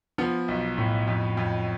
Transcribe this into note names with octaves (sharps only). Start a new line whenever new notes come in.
F3 B3
B1
A2
F2
F2